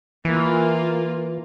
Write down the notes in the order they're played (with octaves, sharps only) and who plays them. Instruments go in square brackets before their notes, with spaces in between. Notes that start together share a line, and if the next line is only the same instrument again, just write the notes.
[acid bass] E3 [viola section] A#3 F4